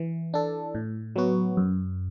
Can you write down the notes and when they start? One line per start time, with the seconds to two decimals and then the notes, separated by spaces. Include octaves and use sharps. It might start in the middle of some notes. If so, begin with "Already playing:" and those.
Already playing: E3
0.34 D4 A4
0.75 A2
1.16 F#3 B3 F#4
1.57 F#2